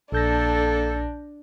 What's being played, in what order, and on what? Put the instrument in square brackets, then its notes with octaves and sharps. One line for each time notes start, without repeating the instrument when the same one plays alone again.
[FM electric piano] A#1 G6 A#6 [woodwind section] A#3 A4 [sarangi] D4